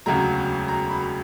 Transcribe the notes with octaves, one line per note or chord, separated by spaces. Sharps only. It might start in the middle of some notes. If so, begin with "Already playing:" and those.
E1 D2 C#3 F#3 A#5
A#5
B5